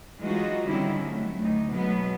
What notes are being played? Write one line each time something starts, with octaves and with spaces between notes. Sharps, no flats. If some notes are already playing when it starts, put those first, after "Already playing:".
E3 F#3 G#3 D#4 F4 F#4
D3 D#3 G3 C4 C#4 E4
F#3 A3
D2 D#4
B2 F#3 G#3 A3 B3